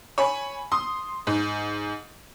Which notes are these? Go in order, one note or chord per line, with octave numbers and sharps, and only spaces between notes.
C#5 G#5 B5
C6 D#6
G#2